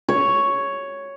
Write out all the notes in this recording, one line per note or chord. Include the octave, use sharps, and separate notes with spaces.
C#5